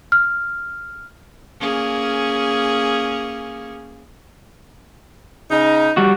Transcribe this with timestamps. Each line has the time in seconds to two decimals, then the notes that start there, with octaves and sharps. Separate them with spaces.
0.12 F6
1.60 A#3 C#4 G#4
5.51 C#3 D#4
5.97 G3 F#4